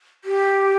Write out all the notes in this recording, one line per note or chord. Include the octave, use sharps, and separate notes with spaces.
G4